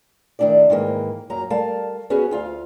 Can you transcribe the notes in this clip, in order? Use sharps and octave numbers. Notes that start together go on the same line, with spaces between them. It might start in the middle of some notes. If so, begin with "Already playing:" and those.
D#3 A3 D4 E4 D5
G#2 D#3 E3 A#3
F#2 F#3 A#3 A#5
G3 A3 A#4 F5 A5
B3 C#4 F#4 G#4
D2 F4 F5